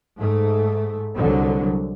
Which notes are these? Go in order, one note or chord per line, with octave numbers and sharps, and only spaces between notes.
G#2 A3
C2 D3 F#3